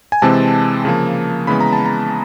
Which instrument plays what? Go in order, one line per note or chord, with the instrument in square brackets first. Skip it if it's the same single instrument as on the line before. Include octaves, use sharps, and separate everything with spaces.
[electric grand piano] G#5
C3 E3 G#3 C4 A5
C#3 F3 A#3
C#3 E3 G#3 B3 B5
A#5
A5
A#5